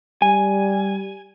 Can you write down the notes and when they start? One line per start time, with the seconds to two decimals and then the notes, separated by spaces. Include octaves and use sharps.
0.22 G3 G#5